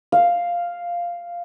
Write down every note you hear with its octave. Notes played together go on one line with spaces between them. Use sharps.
F5